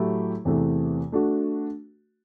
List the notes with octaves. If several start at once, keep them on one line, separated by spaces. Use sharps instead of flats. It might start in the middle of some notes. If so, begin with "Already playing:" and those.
Already playing: A2 F#3 A3 E4 G4
E2 C3 E3 A3
A3 D4 F#4